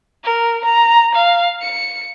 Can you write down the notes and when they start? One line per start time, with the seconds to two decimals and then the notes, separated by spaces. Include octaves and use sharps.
0.24 A#4
0.65 A#5
1.15 F5
1.62 C#7